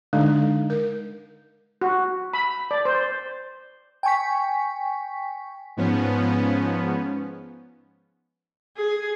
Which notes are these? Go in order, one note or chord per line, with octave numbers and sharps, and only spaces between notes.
D3 G#3 D#4
A#4
F#4
B5
D5
C5
G5 G#5 C#6 B6
G#2 F3 B3 C#4
G#4